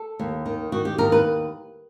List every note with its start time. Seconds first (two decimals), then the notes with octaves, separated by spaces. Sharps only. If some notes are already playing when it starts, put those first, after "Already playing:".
Already playing: A4
0.19 D#2
0.46 D#3
0.72 D#3 F#4
0.85 G4
0.98 D#2 A#4
1.12 B4